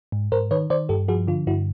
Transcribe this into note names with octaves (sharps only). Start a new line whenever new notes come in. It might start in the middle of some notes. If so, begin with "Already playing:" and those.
G#2
G#2 A#4 C5
D#3 B4 C#5
D#3 C5 D5
G2 G4 A4
F3 F#4 G#4
D3 F4
G2 E4 F#4